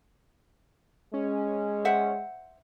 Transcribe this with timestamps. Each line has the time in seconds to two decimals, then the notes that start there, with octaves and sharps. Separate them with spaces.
1.14 G#3 C#4
1.85 C5 E5 F#5